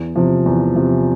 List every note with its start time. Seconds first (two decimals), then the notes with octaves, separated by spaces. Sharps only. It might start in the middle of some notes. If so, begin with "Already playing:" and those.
Already playing: E2
0.16 C3 F3
0.46 E2
0.76 C3 F3